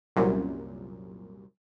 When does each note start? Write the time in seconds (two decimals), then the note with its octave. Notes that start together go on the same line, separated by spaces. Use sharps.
0.16 C2 F#2 A#2